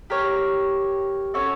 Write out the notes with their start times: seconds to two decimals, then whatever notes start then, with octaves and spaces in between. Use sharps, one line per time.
0.10 G4 A#4 C#5
1.34 C#4 F#4 A4 C#5